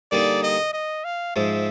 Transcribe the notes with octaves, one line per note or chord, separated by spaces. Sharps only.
D3 G3 A#3 D#4 G#4 D5
D#5
D#5
F5
G#2 F3 G#3 E5